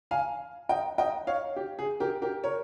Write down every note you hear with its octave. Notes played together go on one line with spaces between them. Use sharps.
F5 G#5
D#5 G5
D#5 G5
C#5 F5
G4
G#4
G4 A#4
G4 A#4
A#4 C#5